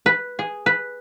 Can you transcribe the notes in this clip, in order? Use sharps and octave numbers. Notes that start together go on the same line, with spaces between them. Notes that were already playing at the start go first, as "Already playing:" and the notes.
B4
G#4
B4